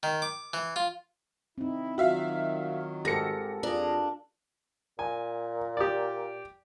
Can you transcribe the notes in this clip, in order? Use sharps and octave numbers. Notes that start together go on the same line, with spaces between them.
D#3
D6
E3
F4
C4 D#4 E4
D#3 F#3 F4 F#4 E5 F5
G#2 G4 A4 A#4 A#6 C#7
F2 D4 F4 G#4 A#5
A#2 G#5
G4 D5